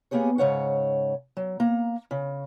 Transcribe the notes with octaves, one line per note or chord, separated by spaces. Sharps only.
A#3 B3 G4 G#4 C#5
G#2 C#3 C#5 F#5
F#3
A#3 A#5
C#3